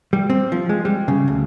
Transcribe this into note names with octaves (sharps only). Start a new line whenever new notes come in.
G3
C4
F3
G#3
G3
C#3
D2